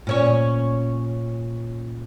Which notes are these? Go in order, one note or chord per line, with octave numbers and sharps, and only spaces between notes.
A#2 C#4 C#5